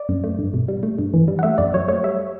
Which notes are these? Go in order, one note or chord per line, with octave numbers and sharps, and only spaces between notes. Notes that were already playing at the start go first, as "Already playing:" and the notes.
Already playing: D5
F#2
A3
G2
B2
G3
A3
G2
E3
G3
F#5
A3 E5
F#2 D5
F#3 C#5
A3 C#5
G3 E5